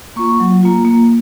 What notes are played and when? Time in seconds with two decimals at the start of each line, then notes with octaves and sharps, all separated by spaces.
0.16 A#3 F4 C#6
0.40 F#3
0.63 A#3 F4
0.85 A#3